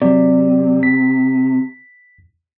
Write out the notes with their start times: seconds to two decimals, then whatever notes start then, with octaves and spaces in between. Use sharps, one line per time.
0.02 C3 F#3 D5
0.83 B6